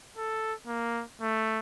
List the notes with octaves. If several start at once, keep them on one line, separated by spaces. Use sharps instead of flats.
A4
A#3
A3